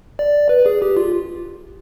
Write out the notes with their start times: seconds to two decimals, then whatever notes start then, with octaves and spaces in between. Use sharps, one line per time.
0.19 D5
0.49 B4
0.66 G#4
0.82 G4
0.97 F4